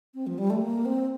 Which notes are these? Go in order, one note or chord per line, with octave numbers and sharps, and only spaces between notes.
C4
F3
G3
A3
A#3
C4